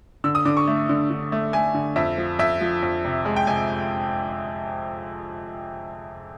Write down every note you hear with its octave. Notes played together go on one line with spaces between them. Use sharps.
D3 E6
D#6
D3 D6
C#6
A3
D3
D3
A3
A3 G#5
D3
F2 E5
F3
F2 E5
F3
F2
C3
G#3
G5
C3 G#5